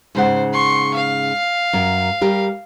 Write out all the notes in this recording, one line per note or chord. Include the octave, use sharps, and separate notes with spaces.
G#2 C#3 C5 F#5
C6 C#6
F5
F#2 A#4
G3 G4 A#4